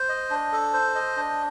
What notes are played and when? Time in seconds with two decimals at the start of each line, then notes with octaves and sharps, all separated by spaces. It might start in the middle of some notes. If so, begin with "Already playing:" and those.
Already playing: C5
0.09 D#5
0.30 D4
0.52 A4
0.73 C5
0.95 D#5
1.17 D4